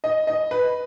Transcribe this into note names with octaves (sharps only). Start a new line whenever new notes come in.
D#5
D#5
B4